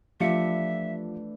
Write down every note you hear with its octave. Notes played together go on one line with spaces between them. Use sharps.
E3 F3 A3 D4 G4 E5 F5 C#7